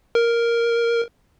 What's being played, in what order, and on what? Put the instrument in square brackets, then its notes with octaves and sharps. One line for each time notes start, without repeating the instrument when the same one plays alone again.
[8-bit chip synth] A#4